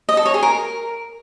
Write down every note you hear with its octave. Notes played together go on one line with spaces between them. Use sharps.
D#5
A4
C#5
G#4
A#4